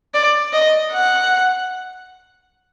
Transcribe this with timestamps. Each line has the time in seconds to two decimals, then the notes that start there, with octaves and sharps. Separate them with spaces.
0.14 D5
0.53 D#5
0.92 F#5